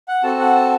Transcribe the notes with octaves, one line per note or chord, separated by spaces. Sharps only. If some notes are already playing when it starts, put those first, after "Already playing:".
F#5
C4 F#4 A4 A5
F#5
A5